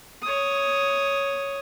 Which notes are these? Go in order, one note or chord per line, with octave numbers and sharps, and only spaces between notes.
C#5 D#6